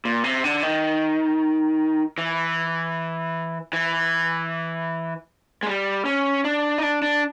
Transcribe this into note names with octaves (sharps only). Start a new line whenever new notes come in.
A#2
C3
D3
D#3
E3
E3
G#3
G3
C#4
D4
D#4
D4
D4